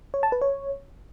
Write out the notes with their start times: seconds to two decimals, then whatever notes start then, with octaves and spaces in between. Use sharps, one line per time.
0.14 C#5
0.23 A5
0.32 B4
0.41 C#5